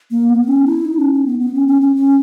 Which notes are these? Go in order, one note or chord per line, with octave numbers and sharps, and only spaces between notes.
A#3
B3
C#4
E4
D#4
C#4
C#4
B3
B3
C#4
C#4
C#4
C#4